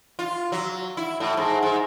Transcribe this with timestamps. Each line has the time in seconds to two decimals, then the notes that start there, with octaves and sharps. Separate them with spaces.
0.19 F4
0.52 F#3
0.97 E4
1.20 A2
1.37 G#2
1.62 G#2